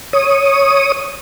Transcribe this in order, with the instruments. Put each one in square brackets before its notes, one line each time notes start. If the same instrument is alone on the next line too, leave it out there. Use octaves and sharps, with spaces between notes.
[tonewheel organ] C#5 D#6